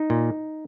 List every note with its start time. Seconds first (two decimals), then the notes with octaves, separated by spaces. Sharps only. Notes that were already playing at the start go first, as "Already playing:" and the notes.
Already playing: D#4
0.10 A#2